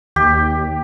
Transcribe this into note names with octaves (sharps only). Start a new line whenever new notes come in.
D#2 G4